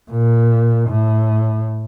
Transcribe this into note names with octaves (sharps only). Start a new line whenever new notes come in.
A#2
A2